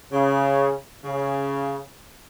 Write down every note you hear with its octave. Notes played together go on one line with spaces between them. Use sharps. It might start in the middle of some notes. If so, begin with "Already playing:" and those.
C#3
C#3